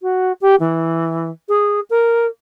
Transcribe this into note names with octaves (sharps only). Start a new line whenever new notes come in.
F#4
G4
E3
G#4
A#4